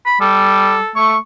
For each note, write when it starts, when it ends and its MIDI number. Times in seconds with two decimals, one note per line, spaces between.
0.06 0.17 83
0.21 0.79 55
0.21 0.91 69
0.96 1.16 57
0.96 1.17 85